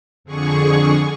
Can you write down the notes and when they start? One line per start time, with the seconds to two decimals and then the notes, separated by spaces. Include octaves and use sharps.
0.24 F2 D3 G#4 C#6